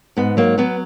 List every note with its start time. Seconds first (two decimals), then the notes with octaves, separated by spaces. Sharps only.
0.17 G#2 B3
0.37 F#3 A#3
0.58 F#3 B3